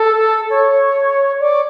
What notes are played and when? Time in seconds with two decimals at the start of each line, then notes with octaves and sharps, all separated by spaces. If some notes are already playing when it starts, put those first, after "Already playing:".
Already playing: A4
0.50 C#5
1.40 D5